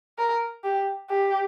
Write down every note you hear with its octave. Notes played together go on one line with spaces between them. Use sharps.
A#4
G4
G4